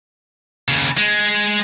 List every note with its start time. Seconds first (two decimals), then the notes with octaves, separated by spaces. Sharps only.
0.68 D#2 C#3
0.98 G#3